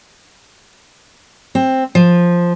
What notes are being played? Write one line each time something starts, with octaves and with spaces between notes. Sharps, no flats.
C4
F3